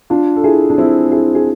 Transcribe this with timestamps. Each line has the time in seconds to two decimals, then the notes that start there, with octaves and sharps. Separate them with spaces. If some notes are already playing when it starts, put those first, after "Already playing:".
0.10 D4 F4
0.36 A4
0.44 E4 G#4
0.70 D4
0.78 C4 E4
1.12 E4 G#4
1.35 G#4